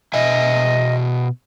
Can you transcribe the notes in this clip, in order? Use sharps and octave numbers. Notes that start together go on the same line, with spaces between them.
B2 D#5 E5 G#5